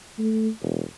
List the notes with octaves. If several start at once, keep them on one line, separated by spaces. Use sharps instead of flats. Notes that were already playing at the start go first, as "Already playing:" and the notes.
A3
E1